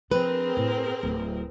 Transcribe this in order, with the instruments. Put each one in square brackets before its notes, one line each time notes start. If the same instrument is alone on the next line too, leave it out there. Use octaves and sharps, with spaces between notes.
[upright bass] F3 D4 [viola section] C4 G#4 A#4 [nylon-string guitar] B4
[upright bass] A2
D1